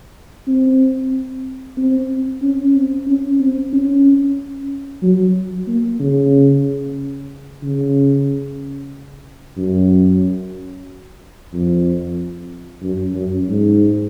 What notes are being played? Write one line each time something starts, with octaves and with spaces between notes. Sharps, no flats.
C4
C4
C#4
C4
C#4
C4
C#4
F#3
A#3
C#3
C#3
F#2
F2
F#2
F#2
G#2